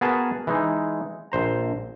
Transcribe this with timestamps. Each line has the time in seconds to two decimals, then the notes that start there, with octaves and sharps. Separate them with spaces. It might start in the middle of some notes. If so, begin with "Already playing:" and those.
0.01 B3 F#4 G#4 A#4 A5
0.47 E3 G#3 D#4
1.32 A#1 C5 A#5